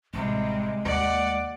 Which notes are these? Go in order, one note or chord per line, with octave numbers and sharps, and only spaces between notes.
A1 C3 G3 G#3
D#2 D5 F#5